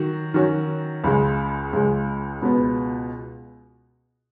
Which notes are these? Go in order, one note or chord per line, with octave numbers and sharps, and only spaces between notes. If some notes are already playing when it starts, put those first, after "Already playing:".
Already playing: D#3 F#3 F#4
D#3 F#3 C#4 F#4
C#2 C#3 G#3
C#2 C#3 G#3
C#2 B2 B3